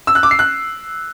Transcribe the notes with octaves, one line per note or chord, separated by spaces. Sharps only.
E6
F#6
D6
C7
F#6